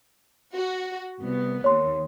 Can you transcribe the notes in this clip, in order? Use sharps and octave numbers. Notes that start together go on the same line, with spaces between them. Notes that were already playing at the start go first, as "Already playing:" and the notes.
F#4
C2 B3
D#2 C#5 C6